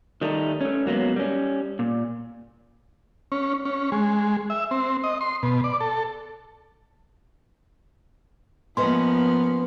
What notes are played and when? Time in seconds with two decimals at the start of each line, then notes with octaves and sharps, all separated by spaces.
0.21 D#3 G3 A3 D#4
0.61 A3 C#4
0.86 G#2 F#3 A#3 B3
1.16 G3 C#4
1.79 A#2
3.32 C#4
3.65 C#4
3.92 G#3
4.50 E5
4.71 C4
5.04 D#5
5.21 C6
5.43 B2
5.64 D5
5.81 A4
8.77 F3 A#3 B3 C#4 B4 D#5 C6